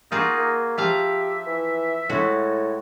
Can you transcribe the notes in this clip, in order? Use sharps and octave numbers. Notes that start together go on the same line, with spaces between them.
A#3 D#4 F4 F#4 G#4
A#3
F3 G4 E5 F5 A#5
E3
A2 G#3 F#4